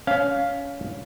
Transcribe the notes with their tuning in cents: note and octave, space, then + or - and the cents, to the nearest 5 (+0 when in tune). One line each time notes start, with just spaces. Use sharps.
C#4 +20 F5 +0